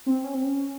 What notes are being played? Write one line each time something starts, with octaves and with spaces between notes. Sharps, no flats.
C4
C#4
C4
C#4